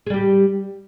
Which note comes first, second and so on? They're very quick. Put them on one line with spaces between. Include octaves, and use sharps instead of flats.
G#4 G3 G4